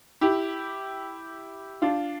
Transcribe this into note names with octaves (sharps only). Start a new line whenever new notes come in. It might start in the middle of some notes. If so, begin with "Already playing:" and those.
E4 G4
D4 F4